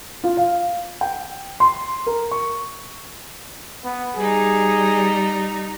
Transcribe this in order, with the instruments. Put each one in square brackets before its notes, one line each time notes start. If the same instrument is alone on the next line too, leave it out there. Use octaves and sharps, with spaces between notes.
[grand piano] F4
F5
G5
C6
A#4
C#6
[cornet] B3
[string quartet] G3 D#4 [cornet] G#4